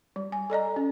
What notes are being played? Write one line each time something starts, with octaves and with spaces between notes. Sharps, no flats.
G3
G#5
A4 D5 D#5 A#5
C#4